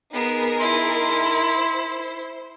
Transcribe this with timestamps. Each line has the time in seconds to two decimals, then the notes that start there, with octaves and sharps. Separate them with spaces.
0.13 B3 D#4 G#4 A#4
0.60 E4 C6
1.57 C5